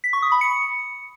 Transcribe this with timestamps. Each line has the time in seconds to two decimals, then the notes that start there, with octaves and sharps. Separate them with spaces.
0.04 B6
0.13 C#6
0.22 D#6
0.32 B5
0.41 C#7